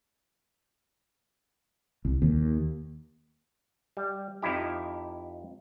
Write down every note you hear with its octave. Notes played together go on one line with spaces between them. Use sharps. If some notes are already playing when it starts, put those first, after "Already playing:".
C2
D#2
G3
F2 F3 D#4 E4 G4